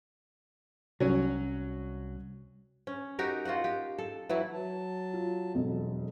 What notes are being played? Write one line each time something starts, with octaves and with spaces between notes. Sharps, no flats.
C2 F#3 C#4
C#4
D#4 F#4 G4 A#4
F4 F#4 D#5 F#5
G4
A4
E3 F#3 E4
F#3 A5
F4
E1 F2 F#3